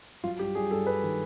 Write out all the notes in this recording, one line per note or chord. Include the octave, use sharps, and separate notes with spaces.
F#3 F4
G2 G4
G2 G#4
G2 A4
G2 B4
D#3